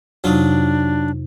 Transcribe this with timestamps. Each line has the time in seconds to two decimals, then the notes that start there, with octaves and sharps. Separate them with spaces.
0.24 F2 C3 F#3 D4 D#4 F4